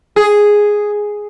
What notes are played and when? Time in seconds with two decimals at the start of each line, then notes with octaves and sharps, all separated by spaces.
0.16 G#4